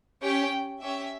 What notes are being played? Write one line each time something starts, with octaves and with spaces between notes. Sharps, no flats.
C#4 G4 G5
C#4 G4 E5